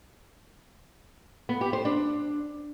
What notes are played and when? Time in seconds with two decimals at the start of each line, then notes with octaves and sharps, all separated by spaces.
1.49 B3
1.61 G4
1.73 C5
1.85 D4